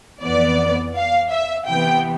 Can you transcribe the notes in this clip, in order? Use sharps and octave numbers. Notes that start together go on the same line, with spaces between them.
F2 E3 B3 D5
F5
E5
C3 E3 B3 G5